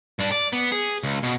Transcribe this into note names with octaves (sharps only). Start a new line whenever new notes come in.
G2 D4
D5
B3
G#4
C#2
B2